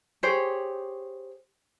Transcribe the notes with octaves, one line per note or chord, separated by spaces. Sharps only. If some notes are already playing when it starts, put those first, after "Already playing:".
G4 G#4 C5 C#5